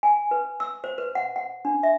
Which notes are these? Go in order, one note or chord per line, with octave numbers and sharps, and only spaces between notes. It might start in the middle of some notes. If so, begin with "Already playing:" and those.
G#5
B4
E6
C5
B4
F#5
F#5
D4
E5